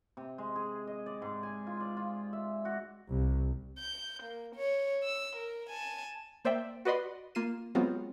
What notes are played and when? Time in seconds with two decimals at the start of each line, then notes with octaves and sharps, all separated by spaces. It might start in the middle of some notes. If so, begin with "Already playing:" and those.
0.17 C3
0.38 G#3
0.56 G#4
0.87 D#5
1.06 D5
1.22 G#2
1.43 G#5
1.67 F4
1.80 D5
1.97 F4
2.33 E5
2.65 F#4
3.10 C2
3.79 G6
4.23 A#3
4.56 C#5
5.04 E6
5.36 A#4
5.70 G#5 A5
6.45 A#3 C5 D5 E5 G5
6.85 F#4 B4 D5 D#5 B5 C6
7.35 A#3 F4 C7 D#7 E7
7.75 F#3 G#3 B3 C4 F4 F#4